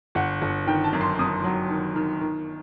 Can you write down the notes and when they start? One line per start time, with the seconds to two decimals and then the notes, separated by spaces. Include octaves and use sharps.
0.15 G1 F#5
0.42 G1
0.67 D#3 G5
0.84 A5
0.93 F#2
1.01 C6
1.19 F#2 D#6
1.44 F#3
1.70 D#3
1.96 D#3
2.21 D#3